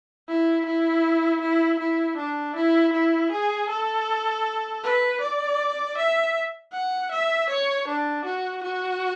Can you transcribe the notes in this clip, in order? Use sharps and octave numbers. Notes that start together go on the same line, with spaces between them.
E4
E4
E4
E4
D4
E4
E4
G#4
A4
B4
D5
E5
F#5
E5
C#5
D4
F#4
F#4